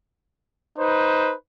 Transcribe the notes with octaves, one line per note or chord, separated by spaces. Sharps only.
D#4 B4 C5